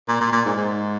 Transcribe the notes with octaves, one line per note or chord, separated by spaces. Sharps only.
A#2
A#2
A#2
G#2
G#2